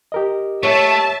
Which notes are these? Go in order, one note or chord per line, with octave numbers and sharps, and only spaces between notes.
G4 A#4 D#5
A3 C#5 E5 A5